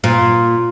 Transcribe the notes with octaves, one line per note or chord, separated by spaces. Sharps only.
A#2